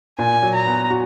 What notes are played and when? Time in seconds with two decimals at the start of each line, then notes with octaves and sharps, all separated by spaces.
0.19 A#2 G#5
0.43 F#3
0.54 A#5
0.66 B3
0.90 F#4